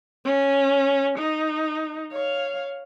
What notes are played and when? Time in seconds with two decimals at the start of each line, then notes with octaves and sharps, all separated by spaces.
0.25 C#4
1.18 D#4
2.12 C#5 F5